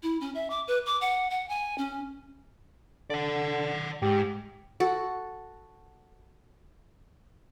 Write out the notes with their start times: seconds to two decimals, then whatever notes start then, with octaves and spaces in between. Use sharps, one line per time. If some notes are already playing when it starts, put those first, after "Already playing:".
0.03 E4
0.21 C#4
0.35 E5
0.50 D6
0.68 B4
0.86 D6
1.01 F#5
1.31 F#5
1.49 G#5
1.78 C#4
3.10 D3 D5 F#5
4.02 G#2 G4
4.80 F#4 A4